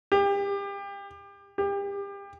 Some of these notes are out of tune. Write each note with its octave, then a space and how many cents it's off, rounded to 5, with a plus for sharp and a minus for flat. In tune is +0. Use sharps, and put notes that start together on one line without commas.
G4 +30
G4 +30